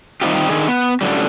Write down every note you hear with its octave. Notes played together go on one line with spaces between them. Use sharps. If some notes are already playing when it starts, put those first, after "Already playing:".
D#3 G3 C4 D#4 F4 G4
D3 D#3 G#4
B3
F#2 A2 D3 G3